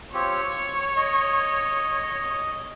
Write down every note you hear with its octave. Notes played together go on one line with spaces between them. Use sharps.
C4 F4 G4 C#5
C#6
D#5